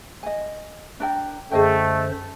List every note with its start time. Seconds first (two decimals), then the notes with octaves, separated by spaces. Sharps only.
0.23 D#5 G#5
1.00 D4 A#4 G5
1.52 F#2 D3 A3 G#4 C5 D#5 G5